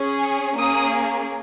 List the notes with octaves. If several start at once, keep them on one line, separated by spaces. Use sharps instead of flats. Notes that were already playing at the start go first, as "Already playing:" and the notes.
Already playing: C#4 G#4
A#3 C#4 G#4 D#6